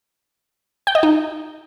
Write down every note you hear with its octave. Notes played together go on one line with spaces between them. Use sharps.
G5
D#5
D#4